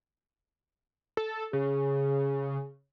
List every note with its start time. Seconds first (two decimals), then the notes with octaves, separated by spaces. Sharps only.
1.17 A4
1.53 C#3 G#4